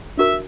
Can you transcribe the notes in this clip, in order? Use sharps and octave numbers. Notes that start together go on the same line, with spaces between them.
D4 F#4 A#4 E5